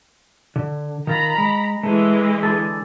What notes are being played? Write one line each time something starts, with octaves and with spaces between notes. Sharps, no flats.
D3
D#3 F4 A#5 B5
G#3
E3 G#3 A3
D3 G#4 A4